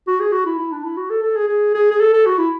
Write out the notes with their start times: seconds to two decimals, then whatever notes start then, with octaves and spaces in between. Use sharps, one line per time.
0.07 F#4
0.20 G#4
0.32 F#4
0.46 E4
0.59 E4
0.72 D4
0.84 E4
0.97 F#4
1.10 A4
1.23 A4
1.36 G#4
1.48 G#4
1.75 G#4
1.91 G#4
2.00 A4
2.14 A4
2.26 F#4
2.38 E4